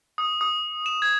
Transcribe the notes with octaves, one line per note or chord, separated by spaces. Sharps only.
D#6
D#6
E7
G#6